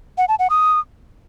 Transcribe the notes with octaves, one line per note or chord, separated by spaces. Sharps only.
F#5
A5
F#5
D#6